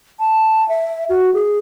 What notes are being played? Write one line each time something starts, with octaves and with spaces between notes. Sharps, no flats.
A5
E5
F#4
G#4